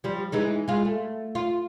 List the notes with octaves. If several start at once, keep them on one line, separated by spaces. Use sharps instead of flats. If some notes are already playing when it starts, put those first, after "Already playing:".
F3 G3
E3 G#3 D#4
G#3 F4
A3
F4